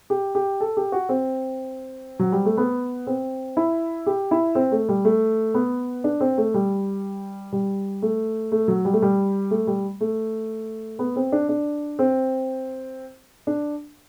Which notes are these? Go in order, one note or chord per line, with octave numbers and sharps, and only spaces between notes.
G4
G4
A4
G4
F#4
C4
F#3
G3
A3
B3
C4
E4
G4
E4
C4
A3
G3
A3
B3
D4
C4
A3
G3
G3
A3
A3
F#3
G3
A3
G3
A3
G3
A3
B3
C4
D4
D4
C4
D4